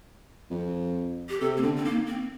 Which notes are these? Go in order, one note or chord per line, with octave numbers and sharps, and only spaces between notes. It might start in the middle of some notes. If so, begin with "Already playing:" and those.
F2
G4
C3 A4
A#3
D3 C4
C4
D#3 A#3
C4